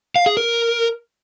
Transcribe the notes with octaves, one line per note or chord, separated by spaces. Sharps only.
F5
G#4
A#4